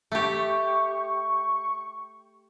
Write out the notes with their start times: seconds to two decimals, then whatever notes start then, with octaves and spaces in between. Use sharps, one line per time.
0.12 A3 G4 C#6